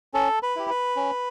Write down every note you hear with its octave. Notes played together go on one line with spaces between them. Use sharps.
C#4 A4
B4
E4 G4
B4
C#4